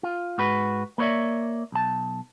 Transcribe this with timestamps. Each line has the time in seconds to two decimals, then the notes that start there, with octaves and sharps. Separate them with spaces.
0.03 F4
0.38 G#2 F#4 B4
0.98 A#3 B4 C#5 D5 E5
1.72 B1 A5